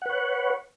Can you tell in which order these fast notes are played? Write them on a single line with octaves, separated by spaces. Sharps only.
F#5 B4 C#5